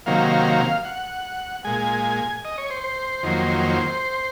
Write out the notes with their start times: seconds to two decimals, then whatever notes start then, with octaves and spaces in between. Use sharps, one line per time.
0.06 C3 D#3 F#3 A#3 F5
0.85 F#5
1.64 A#2 G#3 G#5
2.45 D#5
2.58 C#5
2.70 C5
2.84 C5
3.23 F2 D#3 F#3 A#3
3.63 C5